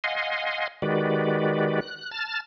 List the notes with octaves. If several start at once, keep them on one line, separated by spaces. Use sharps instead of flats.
D#5 F5 F#5 G#5 C6
D#3 G#3 F#4 G4 B4 D5
F#6
A5 F6 A6